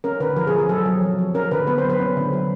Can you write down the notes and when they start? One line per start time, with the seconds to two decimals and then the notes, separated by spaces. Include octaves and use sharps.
0.04 C#4 A#4
0.20 D3 B4
0.36 F3 A#4
0.47 G#4
0.53 F3
0.58 G#4
0.69 F#3 A4
0.85 F#3
1.02 F3
1.18 F3
1.34 C#4 A#4
1.51 D3 B4
1.67 B3 B4
1.78 C5
1.84 F#3
1.90 B4
2.00 C#4
2.17 D3
2.33 F#3